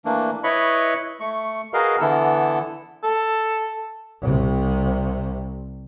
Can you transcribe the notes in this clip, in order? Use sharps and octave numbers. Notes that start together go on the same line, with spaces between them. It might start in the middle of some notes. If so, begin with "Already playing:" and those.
E3 A3 A#3 D4
E4 B4 C#5 D#5 B5 C#6
A3 C#6
F#4 G#4 A#4 B4 D#5 F5
D3 E3 B3 E4 A4 E6
A4
C2 C3